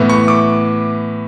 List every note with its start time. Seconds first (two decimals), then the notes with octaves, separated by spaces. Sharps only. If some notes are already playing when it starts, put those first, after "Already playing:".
Already playing: A2 E3 B3
0.10 C#6
0.28 D6